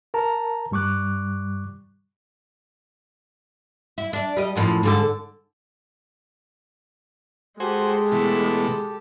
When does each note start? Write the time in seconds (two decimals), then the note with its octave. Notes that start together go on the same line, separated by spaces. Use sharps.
0.14 A#4 A5 A#5
0.71 G2 G3 C#6 D6 F#6
3.98 E4
4.13 D4
4.37 G3 D#5
4.56 F#2 A2 F3
4.83 G#2 D3 A4
7.60 G#3 F#4 G4 A4 C5 G#5
8.12 B2 E3 A3